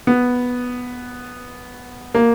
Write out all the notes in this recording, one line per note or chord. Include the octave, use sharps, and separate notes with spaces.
B3
A#3